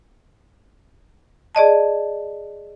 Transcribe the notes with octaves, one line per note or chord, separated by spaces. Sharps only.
G#4 D5 D#5 A5